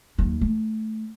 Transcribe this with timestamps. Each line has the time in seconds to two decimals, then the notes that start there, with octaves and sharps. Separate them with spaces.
0.18 D#2 F#3
0.41 A3